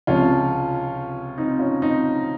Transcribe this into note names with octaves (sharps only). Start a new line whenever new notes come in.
C#2 C3 F3 C#4 F4
C4 D#4
C#4 F4
C4 D#4